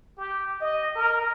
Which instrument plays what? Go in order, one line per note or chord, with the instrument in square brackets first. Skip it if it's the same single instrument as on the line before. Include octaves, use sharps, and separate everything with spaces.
[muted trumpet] G4
D#5
A#4